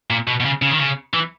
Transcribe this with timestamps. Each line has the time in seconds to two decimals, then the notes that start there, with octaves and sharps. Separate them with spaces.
0.10 A#2
0.27 B2
0.40 B2
0.45 C#3
0.62 C#3
0.71 D#3
0.78 C#3
1.14 E3